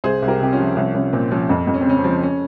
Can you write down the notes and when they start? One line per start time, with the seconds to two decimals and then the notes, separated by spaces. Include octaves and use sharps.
0.04 C2 G#4 C5
0.22 C2
0.28 G4 A#4
0.40 C3 G4
0.52 C#4 F4
0.59 F3
0.77 C2 C#4
0.94 C2 C#4
1.13 A#2 C4
1.31 F3 C#4
1.49 F2
1.67 F2
1.74 C#4
1.81 C4
1.86 C#3 C#4
1.98 C4
2.04 F3
2.23 C#4